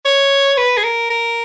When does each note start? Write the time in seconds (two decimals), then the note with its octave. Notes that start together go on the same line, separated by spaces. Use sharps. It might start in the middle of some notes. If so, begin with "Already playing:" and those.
0.05 C#5
0.57 B4
0.77 G#4
0.84 A#4
1.10 A#4